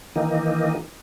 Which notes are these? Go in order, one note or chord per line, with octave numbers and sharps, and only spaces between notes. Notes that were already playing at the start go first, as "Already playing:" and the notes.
D#3 E3 A#3 D#4